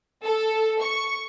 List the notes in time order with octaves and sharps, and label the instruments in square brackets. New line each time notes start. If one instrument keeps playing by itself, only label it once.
[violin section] A4
C#6